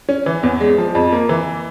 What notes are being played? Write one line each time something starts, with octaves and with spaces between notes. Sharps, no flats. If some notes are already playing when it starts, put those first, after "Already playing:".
C#4
E3
E2
G#3
F3
F2
A#3
E3